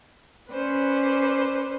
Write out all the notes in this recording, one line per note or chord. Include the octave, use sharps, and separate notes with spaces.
C#4 B4 C5 D5